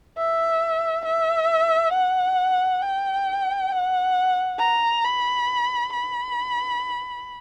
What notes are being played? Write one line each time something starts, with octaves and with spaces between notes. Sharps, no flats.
E5
E5
F#5
G5
F#5
A#5
B5
B5